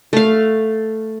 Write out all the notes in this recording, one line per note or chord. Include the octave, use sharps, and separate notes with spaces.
A3 F5